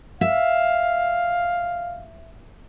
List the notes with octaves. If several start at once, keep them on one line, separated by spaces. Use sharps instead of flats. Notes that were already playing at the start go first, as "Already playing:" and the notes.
E5 F5